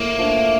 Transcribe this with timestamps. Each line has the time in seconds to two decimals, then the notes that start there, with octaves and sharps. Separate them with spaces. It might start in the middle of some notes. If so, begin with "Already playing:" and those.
Already playing: A2 A#3
0.19 F3 A3 D4